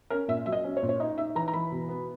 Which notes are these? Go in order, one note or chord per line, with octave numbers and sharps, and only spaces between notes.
C#4 A#4
A#2 E5
F#3 E5
D#5
C#4
C#5
A#2
C#5
D#4 D#5
D#4 E5
E3 A#5
A#5
E3 B5
B2
B3